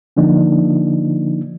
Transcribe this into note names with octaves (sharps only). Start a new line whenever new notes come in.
D3 F3 A#3 D4 D#4